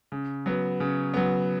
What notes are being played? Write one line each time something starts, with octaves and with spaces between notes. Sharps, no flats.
C#3
F#3 B3
C#3
F#3 B3